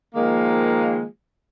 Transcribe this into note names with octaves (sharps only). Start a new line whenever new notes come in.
D#3 F3 G#3 A#3